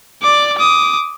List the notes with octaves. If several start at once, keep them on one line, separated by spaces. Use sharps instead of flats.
D5 D6
D6 D#6